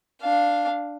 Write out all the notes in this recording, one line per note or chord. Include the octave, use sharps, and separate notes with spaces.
D4 F5